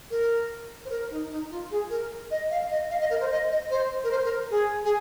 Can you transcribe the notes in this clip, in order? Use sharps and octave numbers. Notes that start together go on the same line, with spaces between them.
A#4
C5
A#4
D#4
D#4
F4
G#4
A#4
D#5
F5
D#5
F5
D#5
A#4
C5
D#5
D#5
C5
A#4
C5
A#4
G#4
G#4